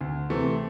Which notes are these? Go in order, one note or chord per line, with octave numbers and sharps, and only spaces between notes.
D2
C3 E3 A3 C4